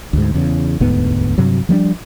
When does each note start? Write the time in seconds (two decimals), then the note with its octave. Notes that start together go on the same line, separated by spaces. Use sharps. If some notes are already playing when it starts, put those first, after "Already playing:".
0.13 D2 G#2
0.34 E2 C#3
0.80 E1 D2 G#2 B3
1.38 G2 C3 F#3
1.69 F3 G3 A3 D4